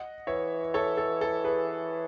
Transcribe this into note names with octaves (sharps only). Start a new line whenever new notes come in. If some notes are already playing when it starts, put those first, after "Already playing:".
Already playing: D#5 F#5
E3 C#5 E5
A4 C#5
A4
A4
G#4 B4